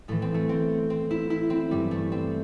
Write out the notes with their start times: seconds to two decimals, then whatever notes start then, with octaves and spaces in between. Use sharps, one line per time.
0.08 A2 E3 A3
0.22 C4
0.34 A3
0.49 C4
0.90 C4
1.11 E4
1.30 E4
1.50 C4
1.71 G2 E3 G3
1.91 A3
2.12 C4